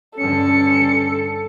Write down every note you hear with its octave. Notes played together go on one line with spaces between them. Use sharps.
G2 D3 C#4 A4 C#7